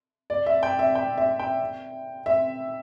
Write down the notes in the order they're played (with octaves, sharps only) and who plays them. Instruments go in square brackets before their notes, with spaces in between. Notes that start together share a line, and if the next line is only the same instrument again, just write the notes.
[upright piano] D5
E5
G5
E5
G5
E5
G5
E5